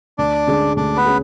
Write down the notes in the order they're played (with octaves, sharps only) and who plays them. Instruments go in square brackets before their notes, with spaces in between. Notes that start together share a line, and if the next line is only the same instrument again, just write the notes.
[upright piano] D2 [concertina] D4 D5
[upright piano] D3 G#3 C#4 G#4
[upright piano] D2 [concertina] D4 D5
[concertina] B3 B4
[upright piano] C#4 G#4